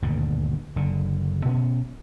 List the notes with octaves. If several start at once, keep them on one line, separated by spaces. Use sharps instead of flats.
D#1 D2 G2 B2
F#1 D3
B2 B3 C#4